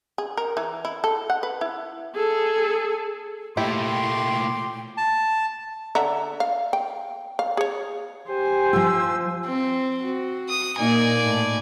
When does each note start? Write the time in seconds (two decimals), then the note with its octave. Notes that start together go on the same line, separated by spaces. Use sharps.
0.18 G#4
0.37 A#4
0.57 E3
0.85 E4
1.04 A4
1.30 F#5
1.43 B4
1.61 E4
2.15 G#4 A4
3.57 A#2 A3 E4 G4 G5 C6 D6
4.97 A5
5.95 D3 E5 A#5
6.40 F5
6.73 G5
7.39 F5
7.57 G#4 C#5
8.29 G4 C5 G#5
8.73 F3 F4 E6
9.45 C4
10.03 F#4
10.49 D#6
10.78 A#2 A#3 D#4 D5 G#5
11.23 A2